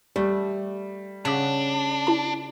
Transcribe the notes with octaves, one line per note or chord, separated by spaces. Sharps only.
G3 A3
C#3 D4 F#5 D6 B6
E4 A5